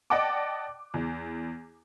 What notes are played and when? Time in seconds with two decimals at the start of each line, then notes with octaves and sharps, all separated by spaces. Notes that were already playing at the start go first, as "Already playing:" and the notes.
0.10 D5 D#5 F#5 G5 A5 D6
0.94 E2